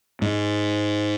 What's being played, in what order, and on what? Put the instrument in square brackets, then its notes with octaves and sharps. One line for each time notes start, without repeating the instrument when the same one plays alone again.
[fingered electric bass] G#2